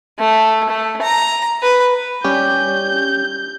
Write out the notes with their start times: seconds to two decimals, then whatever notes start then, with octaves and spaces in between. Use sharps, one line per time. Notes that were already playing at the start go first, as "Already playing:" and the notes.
0.19 A3
0.69 A3
1.02 A#5
1.63 B4
2.24 G3 C#4 G4 G6